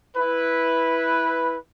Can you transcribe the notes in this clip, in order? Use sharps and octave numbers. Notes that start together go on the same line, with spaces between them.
E4 B4